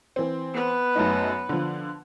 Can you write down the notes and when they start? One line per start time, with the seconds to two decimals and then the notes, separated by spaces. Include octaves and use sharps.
0.16 E3 C4
0.54 B3 B4
0.95 F#2 A3 D#4
1.49 D3 F3